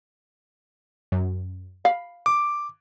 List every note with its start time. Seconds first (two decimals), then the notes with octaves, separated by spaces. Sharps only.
1.12 F#2
1.85 F5 B5
2.26 D6